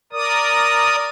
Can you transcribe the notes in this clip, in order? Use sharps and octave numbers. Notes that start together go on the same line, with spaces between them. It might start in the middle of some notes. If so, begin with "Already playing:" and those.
A#4 D5 D#6